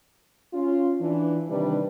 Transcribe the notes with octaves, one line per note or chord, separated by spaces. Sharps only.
C#4 F4
E3 D4
C3 D#3 G3 D4 B4